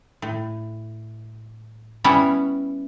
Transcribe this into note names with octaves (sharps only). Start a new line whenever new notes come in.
A2
G3 B3 C#4 E4